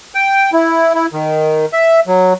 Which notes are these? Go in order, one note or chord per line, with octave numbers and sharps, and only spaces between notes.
G5
E4
E4
D#3
E5
F#3